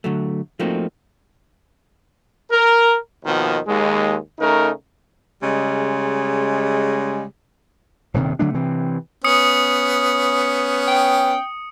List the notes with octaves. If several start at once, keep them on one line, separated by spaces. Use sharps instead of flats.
D3 F#3 A3
F3 A3 A#3 C4 D#4 F#4
A#4
D#2 B2 D#3 F3
D#2 G#3
C#3 A3 D#4 A#4
C#3 G3 G#3
D#1 G2 C3 D#3
D3 F#3 A3 D4
C3 E3 C4
B3 C#4 D#6 C#7
G5